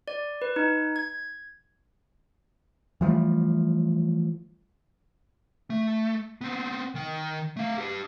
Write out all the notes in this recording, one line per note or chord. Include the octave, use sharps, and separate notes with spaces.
D5
B4
D#4
G#6
E3 F3 G3 A3
A3
B3 C4
D#3 G5
A3 F5
G4 B4